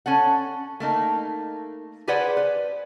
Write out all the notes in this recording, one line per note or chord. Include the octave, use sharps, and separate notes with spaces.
C#4 A4 F#5
A3 A#3 D#4
G4 G#4 B4 C5 D5 F#5
B4